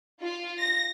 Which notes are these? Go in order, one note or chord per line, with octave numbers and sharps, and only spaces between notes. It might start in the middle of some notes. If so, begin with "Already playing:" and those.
F4
A#6